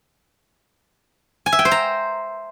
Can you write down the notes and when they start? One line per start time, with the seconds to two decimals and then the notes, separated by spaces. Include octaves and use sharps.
1.46 G#5
1.52 E5
1.59 G5
1.65 C5
1.71 A#5